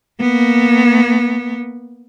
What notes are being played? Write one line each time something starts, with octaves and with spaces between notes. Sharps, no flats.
A#3 B3